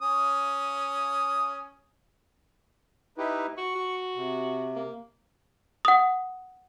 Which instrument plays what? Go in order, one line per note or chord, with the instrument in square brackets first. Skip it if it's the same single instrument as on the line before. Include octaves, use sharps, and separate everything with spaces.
[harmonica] C#4 D#6
[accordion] D#4 E4 B4 [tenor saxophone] G4
[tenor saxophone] F#4 [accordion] C#6
[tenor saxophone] F#4
[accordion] C3
[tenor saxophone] A#3
[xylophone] F#5 D#6